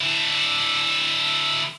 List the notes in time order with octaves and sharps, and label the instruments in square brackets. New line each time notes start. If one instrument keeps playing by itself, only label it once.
[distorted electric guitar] D3 E4